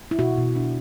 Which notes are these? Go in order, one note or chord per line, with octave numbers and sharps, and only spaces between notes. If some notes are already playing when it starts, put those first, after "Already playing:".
E4
B2 F#4
B2
D4